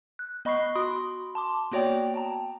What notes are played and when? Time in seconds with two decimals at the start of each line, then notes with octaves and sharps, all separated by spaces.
0.19 F#6
0.45 B3 D#5 B5 C#6 F#6 C7
0.76 F#4 B5 C6 D#6
1.35 A5 C6 D6
1.72 A#3 B3 F#4 C#5 D5 G5
2.14 G5 A5 A#5